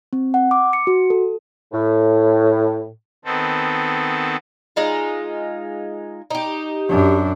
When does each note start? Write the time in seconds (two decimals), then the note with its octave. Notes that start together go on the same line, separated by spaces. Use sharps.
0.13 C4
0.34 F#5
0.51 D6
0.73 C#7
0.87 F#4
1.10 A4
1.72 A2
3.25 D#3 B3 C4 A4
4.76 G#3 D#4 F4
6.30 D#4 G4
6.89 F#2 D4